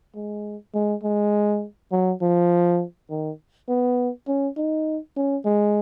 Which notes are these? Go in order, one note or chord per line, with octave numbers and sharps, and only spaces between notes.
G#3
G#3
G#3
F#3
F3
D#3
B3
C#4
D#4
C#4
G#3